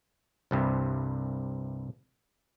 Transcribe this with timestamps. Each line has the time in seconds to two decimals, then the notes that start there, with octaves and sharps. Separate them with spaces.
0.51 C2 G2 C3